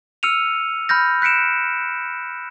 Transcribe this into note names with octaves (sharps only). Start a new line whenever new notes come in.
E6 F6 C#7 D#7 F7
B5 F6 G6 A#6
F#6 B6 C#7 D7 E7